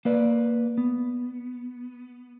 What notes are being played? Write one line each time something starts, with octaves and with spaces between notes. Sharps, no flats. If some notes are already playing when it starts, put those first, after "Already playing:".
A#3 B4 D5
B3